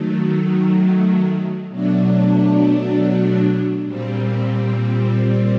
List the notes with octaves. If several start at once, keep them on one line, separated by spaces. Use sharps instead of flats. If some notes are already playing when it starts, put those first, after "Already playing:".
Already playing: D#3 F#3 A3
B2 F#3 A3 D4
A#2 G3 C4